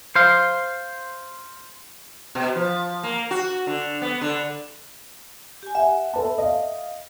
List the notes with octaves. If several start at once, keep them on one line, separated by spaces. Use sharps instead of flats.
C5 F5
B2
F3
A#3
F#4
D3
B3
D3
G4 G#5
E5 F#5
A4 B4 A5
D#5 F5